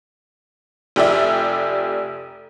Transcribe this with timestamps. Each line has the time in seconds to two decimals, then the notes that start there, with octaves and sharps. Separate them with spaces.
0.96 F1 G4 D5 E5